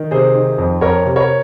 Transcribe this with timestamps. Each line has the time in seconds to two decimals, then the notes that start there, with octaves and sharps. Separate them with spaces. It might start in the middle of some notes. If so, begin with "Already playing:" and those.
Already playing: D#3
0.11 C3 G#4 C5
0.35 D#3
0.58 F2
0.81 F2 A#4 C#5
1.05 C3
1.16 A#4 C#5